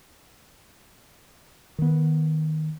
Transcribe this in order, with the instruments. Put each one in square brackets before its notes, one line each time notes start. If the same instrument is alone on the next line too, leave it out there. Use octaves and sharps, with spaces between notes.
[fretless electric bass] D#3 B3